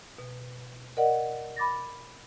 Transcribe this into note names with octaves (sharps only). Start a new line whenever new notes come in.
B2
A#4 D5 D#5 F#5
B5 D6 A6 A#6